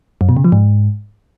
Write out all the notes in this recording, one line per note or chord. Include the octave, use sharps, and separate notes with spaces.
F#2
B2
C#3
F3
G#2